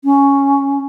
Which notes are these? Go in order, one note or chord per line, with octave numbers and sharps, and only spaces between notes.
C#4